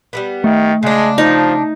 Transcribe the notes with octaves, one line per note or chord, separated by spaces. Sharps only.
G3 G#3 B3
D#3 A3
C#3 G#3 D4
F3 D#4